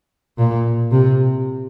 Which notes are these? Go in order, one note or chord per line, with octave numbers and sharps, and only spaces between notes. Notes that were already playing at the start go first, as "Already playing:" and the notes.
A#2
C3